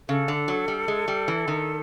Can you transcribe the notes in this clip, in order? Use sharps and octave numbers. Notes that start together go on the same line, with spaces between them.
C#3 A4
D3
F#3
G3
G#3
G3
E3
D#3